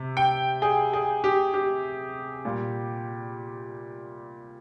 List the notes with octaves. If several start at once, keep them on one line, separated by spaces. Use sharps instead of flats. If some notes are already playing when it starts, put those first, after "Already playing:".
Already playing: C3
G5
G#4
G#4
G4
G4
A#2 G3